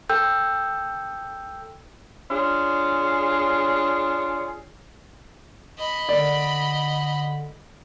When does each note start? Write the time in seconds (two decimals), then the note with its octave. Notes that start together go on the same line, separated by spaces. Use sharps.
0.09 A4 G5 E6 G6
2.30 D4 F4 G#4 C#5
5.79 D#5 B5
6.09 D3 D5